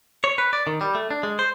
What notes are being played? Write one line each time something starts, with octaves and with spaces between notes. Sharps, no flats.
C#5
B4
D5
D#3
G3
A3
D4
G#3
C5